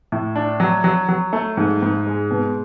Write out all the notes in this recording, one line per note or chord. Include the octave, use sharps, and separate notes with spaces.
A2
D4
F#3
F#3
F#3
A3
G#2
G#2
G#3
B2